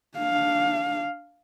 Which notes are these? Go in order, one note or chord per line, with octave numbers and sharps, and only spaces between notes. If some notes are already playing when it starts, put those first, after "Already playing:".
D4 F5